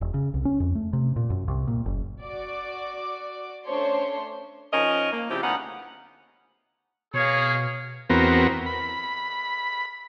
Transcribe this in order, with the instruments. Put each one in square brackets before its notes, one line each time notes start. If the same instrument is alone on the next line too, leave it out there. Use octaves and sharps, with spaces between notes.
[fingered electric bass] E1
C#3
C2
C#4
F2
A3
C3
A#2
F#2
C2
A#2
F#1
[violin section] F#4 D5 D6
A3 C#4 D4 C5 C#5 C6
[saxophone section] F3 C#4 D#4 A#4 D#5
A#3
C#3 F3 G3 C4 E4 G4
D2 B3 C#4 D#4 F5 F#5
[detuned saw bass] B2 [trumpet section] A#3 G#4 [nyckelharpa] C#5 F5
[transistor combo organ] E2 B3 C4 F#4 A#4
B5